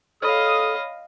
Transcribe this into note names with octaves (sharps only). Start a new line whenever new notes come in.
A4 C#5 D#5 F5 B5 D#6 F6